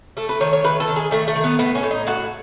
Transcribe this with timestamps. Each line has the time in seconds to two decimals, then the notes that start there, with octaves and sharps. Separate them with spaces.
0.17 A3 A4
0.29 B4
0.40 D#3 C#5
0.53 C#5
0.64 D#3 B4
0.80 A4
0.88 D#3
0.96 G#4
1.11 D#3 A3
1.28 A3
1.35 D#3
1.44 B3
1.59 A2 B3
1.75 C#4
1.83 A2
1.91 D#4
2.07 A2 F#4